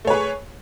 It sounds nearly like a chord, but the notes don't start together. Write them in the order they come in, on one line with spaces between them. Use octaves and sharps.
A3 C#5 B4 G#4